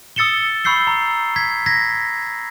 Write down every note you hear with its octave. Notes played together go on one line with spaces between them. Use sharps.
D#6 E6 A6 C#7 E7 G7
B5 C#6 E6 G6 C7 G7
A#5
G#6 B6
G#6 A#6 B6